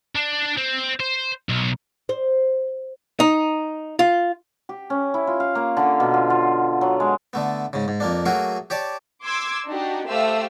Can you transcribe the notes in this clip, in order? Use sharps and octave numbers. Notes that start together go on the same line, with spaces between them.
D4
C4
C5
B1
C5
D#4
F4
G4
C#4
E4
F4
F5
A#3
D3
B2
F4
F4
F#3
G#3
D3 A3 B3
G#2 C#3
G#2
F2 A#3 D4
F#3 A3 A#3 F#4 G#4 A#4
G4 C#5 D5 A5
C6 D6 E6 G#6
D4 D#4 F#4 G4
A3 G4 C5 E5 F5 E6